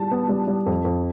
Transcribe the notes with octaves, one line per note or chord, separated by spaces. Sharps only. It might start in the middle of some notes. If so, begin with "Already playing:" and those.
Already playing: G3 A5
B3
G3
G3
F2
F2